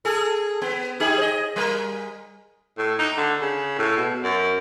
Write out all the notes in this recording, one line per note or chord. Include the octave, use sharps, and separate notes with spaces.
G#4 A4
B3
D#4 G4 G#4
C5 D#5
G3 A#4
A2
D#4
D3
C#3
A2
B2
F#2